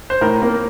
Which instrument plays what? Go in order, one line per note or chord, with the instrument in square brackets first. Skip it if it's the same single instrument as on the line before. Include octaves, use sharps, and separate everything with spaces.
[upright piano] C5
[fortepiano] A2 [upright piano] A#4
[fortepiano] A#3